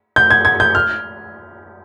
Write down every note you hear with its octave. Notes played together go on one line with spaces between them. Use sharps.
G6
G#6
G#6
G6
F6